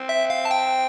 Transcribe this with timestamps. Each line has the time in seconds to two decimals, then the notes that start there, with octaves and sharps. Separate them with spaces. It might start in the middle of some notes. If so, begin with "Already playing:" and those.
Already playing: C4
0.09 E5
0.30 F5
0.45 A5
0.51 G5